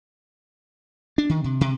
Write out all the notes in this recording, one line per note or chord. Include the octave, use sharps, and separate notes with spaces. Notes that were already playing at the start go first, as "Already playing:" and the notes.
D4
D#3
C3
C3